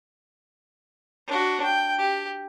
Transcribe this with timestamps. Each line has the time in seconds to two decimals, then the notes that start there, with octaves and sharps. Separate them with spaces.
1.27 D4 F#4
1.64 G5
1.99 G4